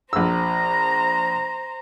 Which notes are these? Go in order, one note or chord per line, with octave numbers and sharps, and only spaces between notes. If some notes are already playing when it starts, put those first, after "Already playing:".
A#1 C5 A#5 E6